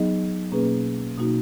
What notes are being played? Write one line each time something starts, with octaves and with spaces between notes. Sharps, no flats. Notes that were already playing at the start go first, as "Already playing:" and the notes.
Already playing: F#3 B3 D#4 G#4 D#5
B2 A#3 C#4 G#4 B4
B2 A#3 D#4 F#4